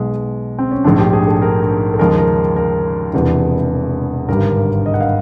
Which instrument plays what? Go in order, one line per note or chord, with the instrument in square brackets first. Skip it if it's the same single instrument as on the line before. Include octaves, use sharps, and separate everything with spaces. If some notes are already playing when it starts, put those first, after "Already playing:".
Already playing: [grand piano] B1 B2 G#3
C4
C#4
A#1 G#2 F3 A3 D4
G4
G#4
A4
A#4
A4
D#2 C#3 F3 G#3 A#4
A#4
A#4
E1 E2 C3 E3
G#1 G2 D3 G3 A#4
D#5
F#5
F5